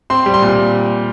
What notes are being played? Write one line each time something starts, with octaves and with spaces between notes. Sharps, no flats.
C4 C6
G3
C6
A#2